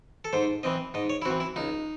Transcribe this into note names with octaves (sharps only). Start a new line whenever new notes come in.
A4
G#2 C5
E3 C4 D#5
G#2 D#5
C#5
E4
C4 F#4
E3
E4
C#2 D#4